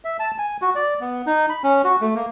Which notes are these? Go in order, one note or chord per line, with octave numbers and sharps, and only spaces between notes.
E5
A5
G#5
F#4
D5
B3
D#4
B5
C#4
F#4
A3
A#3